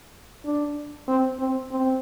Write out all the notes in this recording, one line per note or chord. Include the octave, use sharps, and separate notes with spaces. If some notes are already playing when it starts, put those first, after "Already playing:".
D4
C4
C4
C4